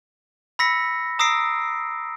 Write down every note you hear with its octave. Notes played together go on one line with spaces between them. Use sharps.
B5 E6 A#6 B6 C#7
A#5 D#6 E6 A#6 C7 D7